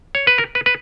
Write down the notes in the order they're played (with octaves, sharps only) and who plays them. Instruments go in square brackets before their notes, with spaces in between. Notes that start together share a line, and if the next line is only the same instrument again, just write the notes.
[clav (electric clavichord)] C#5
B4
A#4
B4
B4